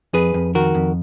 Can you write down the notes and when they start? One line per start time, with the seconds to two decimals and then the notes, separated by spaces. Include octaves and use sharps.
0.13 F2 G#4 B4
0.34 F2
0.55 D#3 F#4 A#4
0.75 F2